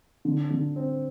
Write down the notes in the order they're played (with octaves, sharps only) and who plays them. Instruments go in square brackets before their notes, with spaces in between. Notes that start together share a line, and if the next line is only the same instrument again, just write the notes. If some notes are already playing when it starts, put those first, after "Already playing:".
[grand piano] D3
D3
C4